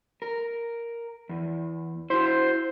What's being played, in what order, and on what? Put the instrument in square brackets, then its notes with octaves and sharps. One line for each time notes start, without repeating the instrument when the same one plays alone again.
[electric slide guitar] A#4
E2
[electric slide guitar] E4 F#4 [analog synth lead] C5